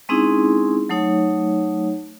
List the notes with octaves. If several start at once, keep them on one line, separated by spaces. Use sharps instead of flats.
G#3 C4 C#4 D#4 E4 G#4
F#3 A3 D#4 C#5